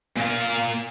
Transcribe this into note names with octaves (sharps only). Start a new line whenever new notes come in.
A#2 F5